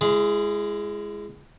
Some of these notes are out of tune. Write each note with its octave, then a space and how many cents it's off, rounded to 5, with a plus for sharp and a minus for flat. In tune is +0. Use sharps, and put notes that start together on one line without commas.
G#3 +0 E4 +40 G#4 +0